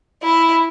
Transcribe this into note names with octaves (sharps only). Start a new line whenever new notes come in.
E4